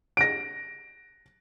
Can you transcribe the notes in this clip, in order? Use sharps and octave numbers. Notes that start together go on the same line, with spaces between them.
A#6 D7